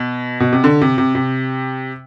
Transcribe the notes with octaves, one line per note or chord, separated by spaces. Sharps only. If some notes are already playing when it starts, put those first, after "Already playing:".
Already playing: B2
B2
C3
D3
C3
C3
C3